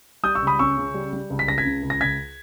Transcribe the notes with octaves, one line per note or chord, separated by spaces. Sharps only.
G3 D#6 G6
C#6 E6
C#2
B5 D#6
C#4 C#6 E6
C#3
G3
G3
C#2
B6
C#2 A#6
G#6 B6
C#3
C#2
A#6
C#2 G#6 B6